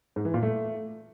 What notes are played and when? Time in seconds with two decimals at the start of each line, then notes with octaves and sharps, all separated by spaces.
0.16 G#2
0.25 E3
0.34 A#2
0.43 A3